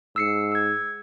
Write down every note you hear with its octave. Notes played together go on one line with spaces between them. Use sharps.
G#2 E6 C7 C#7
E6 G#6